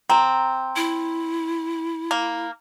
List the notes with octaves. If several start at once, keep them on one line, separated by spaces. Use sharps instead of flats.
C4 A#5
E4
A#3